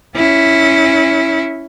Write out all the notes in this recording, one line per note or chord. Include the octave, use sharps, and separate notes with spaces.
C#4 E4